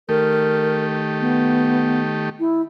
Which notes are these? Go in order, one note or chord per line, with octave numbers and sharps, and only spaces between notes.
D#3 A3 G4 A#4
B3
E4